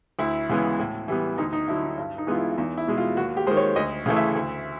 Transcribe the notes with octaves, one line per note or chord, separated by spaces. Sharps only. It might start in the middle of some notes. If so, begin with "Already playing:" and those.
D2 E4
C#3 E3 G#3 B3
A2
E3 G3 B3
D2 D#4
D#4
D3 F#3 E4
D#4
G2
D#4
E3 G#3 B3 F4
E4
E2 D#4
E4
B2 G#3
F4
D#2 F#4
G4
D#3 G#3 C5
C#5
D2 D#5
C#3 E3 A3
E5
D2